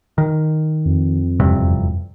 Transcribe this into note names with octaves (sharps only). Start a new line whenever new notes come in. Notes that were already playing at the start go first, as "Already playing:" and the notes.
D#3
F2
E1 G2 C3